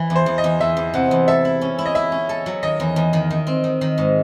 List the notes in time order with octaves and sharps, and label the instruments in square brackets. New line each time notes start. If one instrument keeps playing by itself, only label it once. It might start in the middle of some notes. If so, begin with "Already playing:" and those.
Already playing: [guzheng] E3
E2
[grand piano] C5
[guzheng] E2
[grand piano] D#5
[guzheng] E2
[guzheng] E2 [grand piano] E5
[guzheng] E2
[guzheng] C3 [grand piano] F#5
[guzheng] E2
[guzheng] A4 [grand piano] E5
[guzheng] E4
C#4
E4
[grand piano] D#5
[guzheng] E4 [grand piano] E5
[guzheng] C#4
A4
F#3
[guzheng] D#3 [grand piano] D#5
[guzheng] E2
E2
D#3
D#3
C4
D#3
D#3
G#2